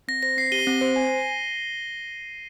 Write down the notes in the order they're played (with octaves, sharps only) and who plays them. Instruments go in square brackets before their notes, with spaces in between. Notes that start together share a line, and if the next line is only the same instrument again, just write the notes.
[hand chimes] C4 [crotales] A#6
[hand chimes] C5 [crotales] A#6
[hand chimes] C4 [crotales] C7
[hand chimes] G4 [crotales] D#7 G7
[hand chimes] C4
C5
G#5